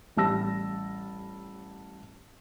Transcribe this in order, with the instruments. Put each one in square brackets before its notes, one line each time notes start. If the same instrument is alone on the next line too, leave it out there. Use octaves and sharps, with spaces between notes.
[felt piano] A1 G3 A5 E6 A#6